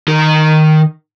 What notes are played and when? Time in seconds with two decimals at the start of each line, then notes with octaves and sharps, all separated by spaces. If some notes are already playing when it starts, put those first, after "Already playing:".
0.08 D#3 A#4